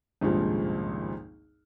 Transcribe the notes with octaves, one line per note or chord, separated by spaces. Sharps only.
G#1 C#2 G2 A#2 F3